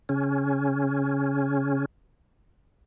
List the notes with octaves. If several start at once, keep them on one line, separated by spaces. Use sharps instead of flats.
C#3 C#4